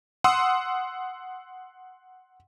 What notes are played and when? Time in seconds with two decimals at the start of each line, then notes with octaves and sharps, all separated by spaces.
0.24 F#5 C6 D#6 E6